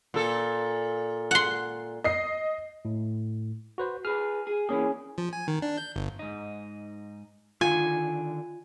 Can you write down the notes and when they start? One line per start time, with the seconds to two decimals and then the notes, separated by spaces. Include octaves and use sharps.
0.14 A#2 A4
1.31 F#5 C6
2.04 D#5 C7
2.85 A2
3.78 F#4 B4 C5
4.05 G#4 B4 F6
4.47 G#4
4.69 E3 A#3 C#4 G#4
5.18 F3
5.33 G#5
5.48 D#3
5.62 D4
5.77 G6
5.96 G1
6.19 G#2 D#4
7.61 D3 D#3 F4 G#5